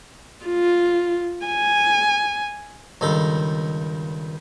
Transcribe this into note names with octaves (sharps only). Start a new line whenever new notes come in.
F4
G#5
C#2 G2 D#3 A4